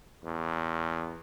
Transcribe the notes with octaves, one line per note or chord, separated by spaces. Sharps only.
E2